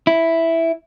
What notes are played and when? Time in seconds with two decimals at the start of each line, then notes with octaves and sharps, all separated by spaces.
0.07 E4